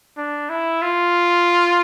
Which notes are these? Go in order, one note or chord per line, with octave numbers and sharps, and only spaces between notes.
D4
E4
F4